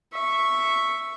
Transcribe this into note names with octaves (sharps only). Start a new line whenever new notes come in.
E5 C#6